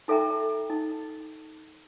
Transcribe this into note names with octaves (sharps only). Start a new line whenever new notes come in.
D#4 A4 E5 G5 A#5
D#4